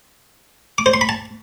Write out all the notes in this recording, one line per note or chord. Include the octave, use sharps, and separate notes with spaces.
D6
C5
C6
B5
A5